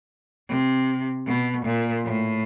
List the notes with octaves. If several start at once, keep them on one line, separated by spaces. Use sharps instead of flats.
C3
B2
A#2
A2